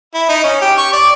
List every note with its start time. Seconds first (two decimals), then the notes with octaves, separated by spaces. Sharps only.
0.15 E4
0.29 D#4
0.44 C#4
0.62 G4
0.78 C#6
0.93 D5